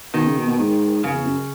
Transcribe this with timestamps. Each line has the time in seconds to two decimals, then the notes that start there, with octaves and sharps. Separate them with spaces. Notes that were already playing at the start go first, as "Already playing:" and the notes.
0.14 B2 D#3
0.25 C#3
0.37 B2
0.48 B2
0.59 G#2
1.04 F#2 C#3
1.14 E2
1.26 F#2